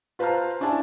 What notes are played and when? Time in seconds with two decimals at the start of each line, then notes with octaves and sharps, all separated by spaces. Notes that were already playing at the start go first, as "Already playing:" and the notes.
0.19 F4 B4 C5 A5 A#5 F6
0.60 C#4 D4 E4 G#5 A5